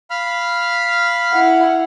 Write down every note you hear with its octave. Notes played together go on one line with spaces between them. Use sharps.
F5 B5 F6
E4 F#5